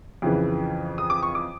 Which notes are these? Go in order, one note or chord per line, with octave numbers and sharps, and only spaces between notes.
F2 C#3 E3
D#6
D6
C#6
D6